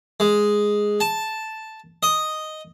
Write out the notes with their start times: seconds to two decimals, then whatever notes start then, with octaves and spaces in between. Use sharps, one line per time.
0.20 G#3
1.01 A5
2.03 D#5